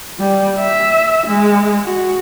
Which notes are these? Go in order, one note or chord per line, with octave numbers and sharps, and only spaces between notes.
G3
E5
G#3
F#4